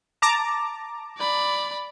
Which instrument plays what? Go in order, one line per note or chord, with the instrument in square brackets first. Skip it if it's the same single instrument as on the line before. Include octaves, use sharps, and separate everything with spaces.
[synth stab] A5 A#5 D6
[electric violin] D5 B5